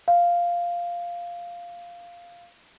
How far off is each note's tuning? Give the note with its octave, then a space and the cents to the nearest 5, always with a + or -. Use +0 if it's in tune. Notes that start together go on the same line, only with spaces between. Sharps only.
F5 -5